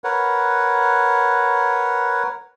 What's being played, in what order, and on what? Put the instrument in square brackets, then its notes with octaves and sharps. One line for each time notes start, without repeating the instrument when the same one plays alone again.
[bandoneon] A#4 B4 C#5 F#5